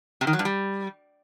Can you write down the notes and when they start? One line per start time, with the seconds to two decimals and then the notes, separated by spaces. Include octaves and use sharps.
0.21 C3
0.27 D#3
0.33 F#3
0.39 G2
0.45 G3